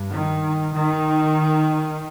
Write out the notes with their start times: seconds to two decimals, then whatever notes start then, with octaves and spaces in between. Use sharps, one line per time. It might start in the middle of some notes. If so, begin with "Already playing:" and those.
Already playing: G2
0.10 D#3
0.73 D#3